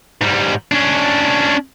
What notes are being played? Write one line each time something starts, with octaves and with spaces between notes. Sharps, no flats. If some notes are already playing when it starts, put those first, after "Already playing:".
G#2 G3
C#4 D4